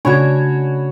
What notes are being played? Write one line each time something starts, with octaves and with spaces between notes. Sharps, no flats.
C#3 A3 D4 F#4 C#5 G#5 B5 G#6